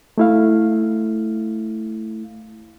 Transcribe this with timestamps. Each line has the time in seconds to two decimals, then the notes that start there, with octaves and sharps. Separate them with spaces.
0.18 A3 E4 F5